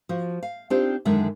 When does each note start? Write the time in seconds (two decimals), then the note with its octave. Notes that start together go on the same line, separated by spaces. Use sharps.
0.09 F3 F#4
0.43 F5
0.70 C4 D4 D#4 F4 G4 C5
1.05 F#2 D3 D#3 G#3 E5